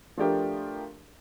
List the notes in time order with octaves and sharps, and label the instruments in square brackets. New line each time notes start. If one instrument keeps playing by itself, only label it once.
[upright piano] F3 A3 D4 G4 A#4